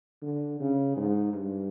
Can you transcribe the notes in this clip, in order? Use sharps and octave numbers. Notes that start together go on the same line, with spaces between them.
D3
C#3
G#2
G2